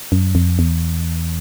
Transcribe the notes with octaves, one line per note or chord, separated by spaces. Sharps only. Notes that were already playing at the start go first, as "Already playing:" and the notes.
F#2
F2
E2